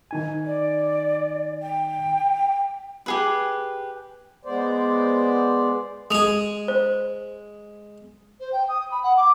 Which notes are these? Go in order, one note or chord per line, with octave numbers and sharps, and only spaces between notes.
D#3 D#4 G#5
D5
G5
G4 G#4 B4
G#3 B3 C5 D5
G#3 G#4 D#6 F7
C5
C5
G5
D#6
B5
F#5
D6